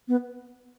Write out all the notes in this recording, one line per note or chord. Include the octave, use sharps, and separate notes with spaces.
B3